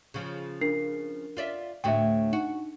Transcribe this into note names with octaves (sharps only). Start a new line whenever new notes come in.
C#3 F3
D4 A#4 C7
F4 D5 E5
D2 A2 F#4 E5 G5
D#4 F#4